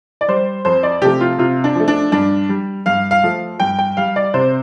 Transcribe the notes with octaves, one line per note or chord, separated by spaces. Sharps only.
D5
G3 C5
F2 C5
D5
C3 F3 A3 G4
F4
C3 F4
D4
F3 A3
D4
G2 D4
G3
G2 F5
F5
F3 A3
G2 G5
G5
G3 F5
D5
C3 C5